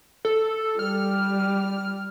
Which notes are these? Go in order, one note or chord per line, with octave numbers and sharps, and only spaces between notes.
A4
G3 F6